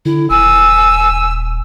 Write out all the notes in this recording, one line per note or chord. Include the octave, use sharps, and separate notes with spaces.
D3 E4
D#1 G#5 E6